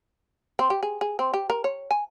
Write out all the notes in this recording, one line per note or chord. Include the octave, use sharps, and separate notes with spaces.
C4
G4
G#4
G#4
C4
G4
A#4
C#5
G#5